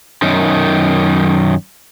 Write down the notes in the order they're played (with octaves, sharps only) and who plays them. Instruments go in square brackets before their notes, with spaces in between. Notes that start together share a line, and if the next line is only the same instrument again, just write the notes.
[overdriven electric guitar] F#2 D#3